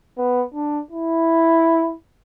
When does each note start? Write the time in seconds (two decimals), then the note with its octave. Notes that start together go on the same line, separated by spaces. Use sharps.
0.18 B3
0.54 D4
0.91 E4